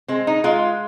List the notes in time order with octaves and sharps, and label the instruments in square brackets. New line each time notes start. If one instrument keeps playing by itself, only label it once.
[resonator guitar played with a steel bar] G#3 C4
D#4
G#3 F4